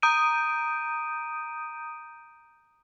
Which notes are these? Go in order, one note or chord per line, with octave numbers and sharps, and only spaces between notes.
A#5 D#6 G6 D7 D#7